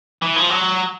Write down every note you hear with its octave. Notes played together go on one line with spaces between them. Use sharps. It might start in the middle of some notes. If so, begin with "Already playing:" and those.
E3
F3
F#3